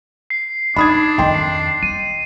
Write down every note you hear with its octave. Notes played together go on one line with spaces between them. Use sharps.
C7
D4 D#4 B5 D#6 G#6
F2 D#3 D#5 G5 C6
C7
B3 D#7